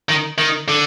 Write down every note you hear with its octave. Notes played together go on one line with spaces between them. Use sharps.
D#3
D#3
D3